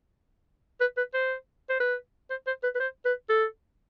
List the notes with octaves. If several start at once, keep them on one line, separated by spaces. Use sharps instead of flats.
B4
B4
C5
C5
B4
C5
C5
B4
B4
C5
B4
A4